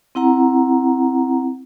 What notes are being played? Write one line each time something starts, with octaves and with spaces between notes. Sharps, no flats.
C4 E4 F#5 A#5